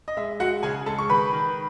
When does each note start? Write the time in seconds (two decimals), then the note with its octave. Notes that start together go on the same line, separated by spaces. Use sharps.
0.08 D#5
0.17 G#3 E5
0.40 G#3 F#4 F#5
0.63 C#3 G#4 G#5
0.86 G#3 A4 A5
0.98 C#6
1.09 D#3 B4 B5
1.33 D#3